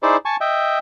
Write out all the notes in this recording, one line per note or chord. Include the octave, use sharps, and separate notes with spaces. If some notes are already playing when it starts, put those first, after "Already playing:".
D#4 E4 G#4 C5 D5
G#5 A5 C#6
D#5 E5 G5